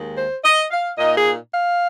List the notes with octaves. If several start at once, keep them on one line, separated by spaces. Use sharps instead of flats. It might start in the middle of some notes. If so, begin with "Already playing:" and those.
Already playing: D#2 D#3 G#3
C5
D#5
F5
A#2 A#3 D#4 D#5
G#4
F5